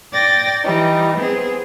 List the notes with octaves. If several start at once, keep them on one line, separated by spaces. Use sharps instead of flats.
D5 G5 A6 A#6
E3 G3 D#4
B3 C4 G#4